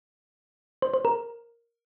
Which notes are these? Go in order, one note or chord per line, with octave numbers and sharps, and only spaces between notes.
C5
C5
A#4